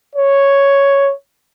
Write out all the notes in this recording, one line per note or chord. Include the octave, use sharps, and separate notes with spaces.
C#5